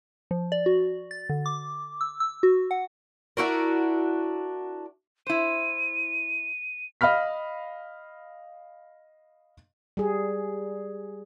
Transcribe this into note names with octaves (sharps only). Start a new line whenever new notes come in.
F3
D5
F#4
A6
D3
D6
E6
E6
F#4
F#5
D4 E4 F#4 A#4
E4 C5 D#7
D#5 F5 B5 F6 B6
G3 G#4